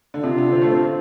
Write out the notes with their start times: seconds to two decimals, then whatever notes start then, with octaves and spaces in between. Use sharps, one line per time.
0.14 D3
0.24 C3 F4
0.38 D3
0.52 C4
0.62 A3
0.71 C4